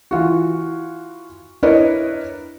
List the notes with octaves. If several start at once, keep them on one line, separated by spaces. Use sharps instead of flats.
E3 F4 F#4
D4 E4 A#4 B4 C#5 D#5